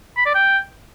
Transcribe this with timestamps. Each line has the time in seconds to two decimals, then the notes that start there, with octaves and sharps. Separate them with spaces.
0.17 B5
0.26 D5
0.34 G5